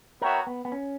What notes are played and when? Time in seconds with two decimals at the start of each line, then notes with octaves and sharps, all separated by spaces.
0.22 B3 F#4 A#4 C#5 E5 G5
0.47 B3
0.65 B3
0.72 C#4